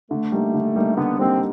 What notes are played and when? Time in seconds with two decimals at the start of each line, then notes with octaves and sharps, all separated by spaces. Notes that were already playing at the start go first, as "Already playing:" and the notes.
0.11 D3 A3
0.32 G3 A#3 D#4
0.54 D3
0.76 G3 A#3 D#4
0.97 D3 B3
1.19 G3 A#3 C4 D#4